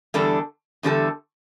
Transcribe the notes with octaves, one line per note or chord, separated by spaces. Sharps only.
E2 D3 G3 D4 A4
E2 D3 G3 D4 A4